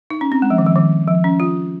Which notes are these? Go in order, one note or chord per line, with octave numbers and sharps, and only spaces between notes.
D#4
C#4
C4
G#3
F3
D#3
F3
D#3
F3
C#4
F4